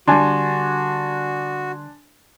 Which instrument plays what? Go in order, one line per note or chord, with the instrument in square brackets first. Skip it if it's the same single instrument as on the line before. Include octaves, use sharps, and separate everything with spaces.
[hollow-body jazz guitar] D3 G3 [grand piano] D4 G#5 [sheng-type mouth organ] F#4 [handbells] C6